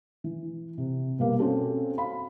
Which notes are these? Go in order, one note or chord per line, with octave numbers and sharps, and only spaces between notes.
E3
C3
B2 G3 A#3
C4 C#4 F#4 A4
F5 B5